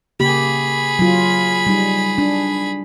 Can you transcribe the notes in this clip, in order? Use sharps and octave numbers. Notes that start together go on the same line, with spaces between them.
C#3 A#3 G4 G#4 B5
F#3 F4
G3 D#4
D4